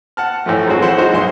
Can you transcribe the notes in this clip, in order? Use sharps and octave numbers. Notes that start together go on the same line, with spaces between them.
F#5 A5 F6
A2 E3 F3 A3
F#3 G#3 C4 F#4 G#4
F3 E4 C5 E5 F#5
G#3 D#4 F#4 C5
B1 C6